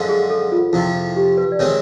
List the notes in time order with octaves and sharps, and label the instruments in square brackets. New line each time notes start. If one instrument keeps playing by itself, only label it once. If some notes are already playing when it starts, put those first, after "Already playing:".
Already playing: [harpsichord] F#2 D3 F3 G#3
[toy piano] G#4
A4
F4
[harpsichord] F2 C3 F3 [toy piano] E4
[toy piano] G4
B4
D5
[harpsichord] C3 D#3 G#3 C4 [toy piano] B4 C#5